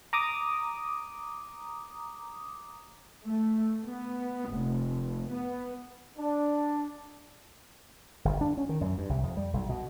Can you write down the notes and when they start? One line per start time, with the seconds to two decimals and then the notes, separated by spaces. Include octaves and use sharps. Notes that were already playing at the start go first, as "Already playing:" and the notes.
0.13 A#5 D6 D#6
3.25 A3
3.87 B3
4.50 F1
5.31 B3
6.17 D4
8.25 G1
8.41 D4
8.57 C#4
8.69 D#3
8.81 F#2
8.98 G2
9.09 C2
9.23 F2
9.37 G3
9.53 B1
9.69 B2